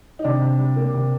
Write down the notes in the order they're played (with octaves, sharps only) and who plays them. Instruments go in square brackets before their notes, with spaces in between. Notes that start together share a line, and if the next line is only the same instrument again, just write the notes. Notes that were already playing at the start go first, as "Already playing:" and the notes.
[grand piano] D#4
C3 D4
C3
G3
A#3
C3